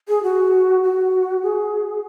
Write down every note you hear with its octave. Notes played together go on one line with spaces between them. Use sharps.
G#4
F#4
F#4
G#4